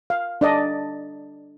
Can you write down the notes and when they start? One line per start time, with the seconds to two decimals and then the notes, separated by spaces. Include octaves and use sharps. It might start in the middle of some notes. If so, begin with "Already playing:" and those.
0.10 F5
0.41 D4 D5 D#5